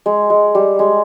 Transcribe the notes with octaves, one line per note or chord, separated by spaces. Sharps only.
G#3
G#3
G3
G#3